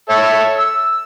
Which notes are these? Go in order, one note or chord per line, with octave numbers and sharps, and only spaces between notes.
A4 C#5 E5
E6